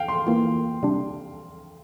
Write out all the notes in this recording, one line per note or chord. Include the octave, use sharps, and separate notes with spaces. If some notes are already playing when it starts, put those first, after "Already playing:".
Already playing: F5 G5
C6
E3 A#3 F4
C3 G3 D4